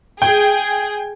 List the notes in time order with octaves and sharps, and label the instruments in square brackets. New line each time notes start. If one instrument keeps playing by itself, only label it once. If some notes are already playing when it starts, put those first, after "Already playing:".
[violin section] G#4 [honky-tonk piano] G5